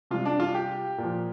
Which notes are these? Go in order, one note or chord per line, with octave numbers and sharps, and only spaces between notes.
C3 G3 F4
D4
F4
G4
A#2
F3